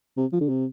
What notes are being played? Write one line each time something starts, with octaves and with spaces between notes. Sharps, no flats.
C3
F3
D3
C3